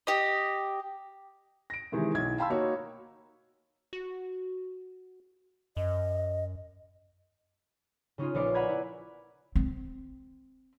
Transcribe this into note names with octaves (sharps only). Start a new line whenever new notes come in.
G4 D#5
A#6 D7
C3 D#3 E3 G#3
B1 E4 G#6
F5 G5 A5 B5 C6 E6
A#3 D#4 F#4 C#5
F#4
F#2 D#5
C#3 C#4 D#4 F4
A#1 B3 A#4 D5 C#7
F#5 G#5 A#5 B5 G#6
E4
C4